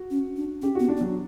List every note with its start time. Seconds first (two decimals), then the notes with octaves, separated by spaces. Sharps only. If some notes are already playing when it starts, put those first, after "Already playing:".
Already playing: F#4
0.10 C#4
0.36 D4
0.62 C#4 G4
0.75 B3 F#4
0.89 D4
0.97 B3
1.01 F#3